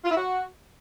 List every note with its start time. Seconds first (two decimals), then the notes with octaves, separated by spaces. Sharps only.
0.05 F4
0.10 E4
0.16 F#4